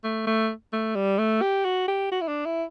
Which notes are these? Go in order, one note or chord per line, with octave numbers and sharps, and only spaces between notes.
A3
A3
A3
G3
A3
G4
F#4
G4
F#4
E4
D4
E4